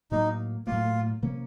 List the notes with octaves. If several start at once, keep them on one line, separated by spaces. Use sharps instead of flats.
A2 F#3 A#3 D#4
A2 F#3 A#3 F4
C3 F3 A#3 C#4